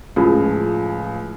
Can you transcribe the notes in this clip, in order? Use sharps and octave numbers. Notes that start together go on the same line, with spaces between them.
C#2 A2 F3 G#4 B5